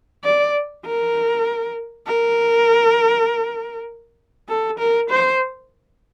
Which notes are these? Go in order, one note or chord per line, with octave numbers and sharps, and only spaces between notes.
D5
A#4
A#4
A4
A#4
C5